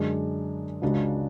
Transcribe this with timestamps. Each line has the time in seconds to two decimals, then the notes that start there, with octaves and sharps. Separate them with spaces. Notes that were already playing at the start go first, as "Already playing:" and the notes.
Already playing: F#2 D3 G#3 D4 G#4
0.82 C#2 C#3 G#3 D4 F#4